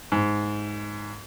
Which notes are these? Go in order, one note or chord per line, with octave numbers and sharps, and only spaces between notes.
G#2